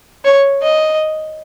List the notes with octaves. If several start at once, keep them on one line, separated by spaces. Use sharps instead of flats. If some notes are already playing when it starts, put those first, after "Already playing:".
C#5
D#5